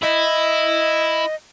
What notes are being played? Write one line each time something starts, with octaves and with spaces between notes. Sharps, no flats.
E4 D#5